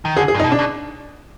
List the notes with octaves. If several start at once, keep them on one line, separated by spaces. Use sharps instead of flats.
D#3
D3 G#4
G#4
G2
D#4
B2
D4
B2